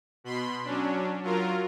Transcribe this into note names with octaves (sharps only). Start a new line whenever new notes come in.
B2 B5 C6
F#3 C#4 D4
F#3 F4 A#4